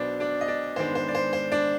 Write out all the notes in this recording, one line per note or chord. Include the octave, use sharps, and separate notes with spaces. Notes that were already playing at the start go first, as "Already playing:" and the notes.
Already playing: B1 B2 B3 D4 C5 D5
D4 D5
D#5
D4 D5
G#2 D#3 G#3 B3 D4 C5
C5
D5
C5
C5
D4 D5